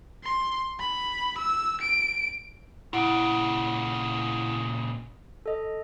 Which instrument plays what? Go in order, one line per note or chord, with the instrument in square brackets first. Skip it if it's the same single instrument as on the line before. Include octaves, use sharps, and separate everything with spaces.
[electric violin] C6
B5
E6
D7
[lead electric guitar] A#2 C#3 [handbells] E4 F#5 D7
[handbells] A4 D#5